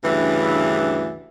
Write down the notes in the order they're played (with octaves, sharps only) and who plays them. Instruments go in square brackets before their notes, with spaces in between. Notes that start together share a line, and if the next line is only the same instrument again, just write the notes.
[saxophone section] D2 G2 C#3 E3